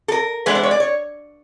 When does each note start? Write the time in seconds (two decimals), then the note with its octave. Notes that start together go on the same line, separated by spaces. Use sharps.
0.08 A4
0.12 A#4
0.46 E3 G#3 B3 D4 B4
0.55 C5
0.63 C#5
0.71 D5
0.80 C#5